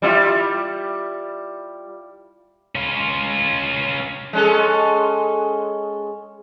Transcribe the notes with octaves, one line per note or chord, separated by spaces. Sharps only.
G3 E4 F4
C#4 F4
G#3 C#4 A4